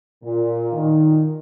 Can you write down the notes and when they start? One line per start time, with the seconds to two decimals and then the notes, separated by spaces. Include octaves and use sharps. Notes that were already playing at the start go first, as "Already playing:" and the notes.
0.24 A#2
0.73 D#3